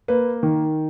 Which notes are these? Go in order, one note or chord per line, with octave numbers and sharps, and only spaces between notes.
A#3 B4
D#3